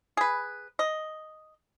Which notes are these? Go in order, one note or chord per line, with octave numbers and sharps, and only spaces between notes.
G#4 B4
D#5